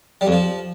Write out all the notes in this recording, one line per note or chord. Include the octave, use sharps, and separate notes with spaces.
G3
F2
F3